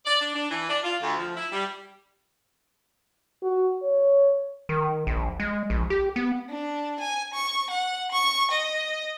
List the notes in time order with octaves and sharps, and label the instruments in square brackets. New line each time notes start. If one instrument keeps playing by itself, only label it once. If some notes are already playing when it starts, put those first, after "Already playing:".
[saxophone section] D5
D4
D4
E3
D4
F4
D2
F3
E4
G3
[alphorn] F#4
C#5
[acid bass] D#3
A#1
G#3
A#1
G4
B3
[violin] D4
G#5
C#6
F#5
C#6
D#5